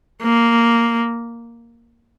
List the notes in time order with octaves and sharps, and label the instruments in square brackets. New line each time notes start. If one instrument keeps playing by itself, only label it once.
[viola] A#3